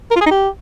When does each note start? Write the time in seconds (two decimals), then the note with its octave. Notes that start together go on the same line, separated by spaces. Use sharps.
0.11 A#4
0.16 F4
0.21 G#4
0.26 D#4
0.31 G4